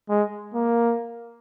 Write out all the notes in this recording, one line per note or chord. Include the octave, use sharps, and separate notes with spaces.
G#3
A#3